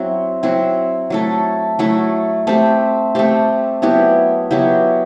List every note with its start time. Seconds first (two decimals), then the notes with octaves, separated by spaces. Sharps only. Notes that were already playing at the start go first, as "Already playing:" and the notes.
Already playing: F#3 C4 E4
0.43 F#3 C4 E4
1.10 F#3 A3 E4 A4
1.79 F#3 A3 E4 A4
2.47 A3 C4 G4
3.15 A3 C4 G4
3.82 F#3 B3 E4 G4
4.51 F#3 B3 E4 G4